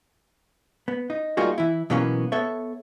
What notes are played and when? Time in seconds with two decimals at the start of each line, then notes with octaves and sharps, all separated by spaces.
0.88 B3
1.10 D#4
1.37 G3 A#3 D#4 F4 F#4 G#4
1.58 E3 E4
1.90 B2 E3 F#3 A#3 B3 C#4
2.32 B3 A4 C#5 E5